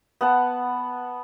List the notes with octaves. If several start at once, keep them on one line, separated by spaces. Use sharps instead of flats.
B3 F#5 A5